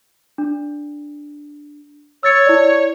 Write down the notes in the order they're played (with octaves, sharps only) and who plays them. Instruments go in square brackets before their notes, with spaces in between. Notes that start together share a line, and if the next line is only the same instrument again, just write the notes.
[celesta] D4
[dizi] C#5 [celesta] E6 A6 C#7
[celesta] E4 D5